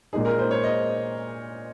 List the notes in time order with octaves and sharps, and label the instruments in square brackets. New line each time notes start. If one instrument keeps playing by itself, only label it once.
[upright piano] A#2 G#3 D#4 [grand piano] G#4
[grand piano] A#4
C5
C#5
D#5